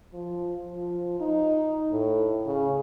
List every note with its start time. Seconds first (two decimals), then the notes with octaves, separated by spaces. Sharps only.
0.14 F3
0.74 F3
1.20 D#4
1.91 A2
2.46 C#3